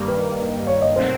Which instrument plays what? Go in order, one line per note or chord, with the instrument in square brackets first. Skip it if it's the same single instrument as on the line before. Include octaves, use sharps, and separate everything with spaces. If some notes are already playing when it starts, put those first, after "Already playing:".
Already playing: [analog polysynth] G2 D#3 G3 A#3
[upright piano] B4
C#5
D#5
[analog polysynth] B2 F#3 A3 C4 [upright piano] C5